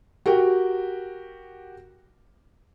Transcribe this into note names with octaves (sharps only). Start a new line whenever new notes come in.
F#4 G4 A#4 G5